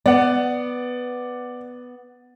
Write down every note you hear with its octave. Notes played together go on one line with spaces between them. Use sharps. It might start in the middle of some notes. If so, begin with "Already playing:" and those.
B3 D5 F#5